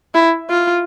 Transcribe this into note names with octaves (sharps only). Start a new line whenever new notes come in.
E4
F4